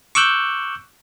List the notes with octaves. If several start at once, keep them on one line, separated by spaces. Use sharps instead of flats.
C#6 D6 E6 F#6 G6